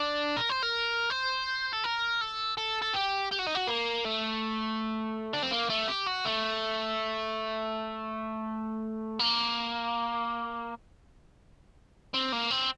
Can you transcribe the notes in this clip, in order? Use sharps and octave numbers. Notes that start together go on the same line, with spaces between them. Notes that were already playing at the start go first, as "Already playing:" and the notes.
Already playing: D4
A#4
C5
A#4
C5
A4
A#4
A4
A4
A4
G4
G4
F#4
D#4
F#4
A#3
A3
D4
C4
A#3
A3
G4
F#4
A3
A#3
C4
A#3
C4